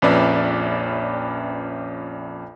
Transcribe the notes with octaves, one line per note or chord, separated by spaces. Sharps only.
A#1 F2 C#4 B4 D5 E5